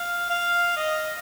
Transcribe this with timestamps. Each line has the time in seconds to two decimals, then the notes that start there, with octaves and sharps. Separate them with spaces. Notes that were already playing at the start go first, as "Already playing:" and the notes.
Already playing: F5
0.30 F5
0.76 D#5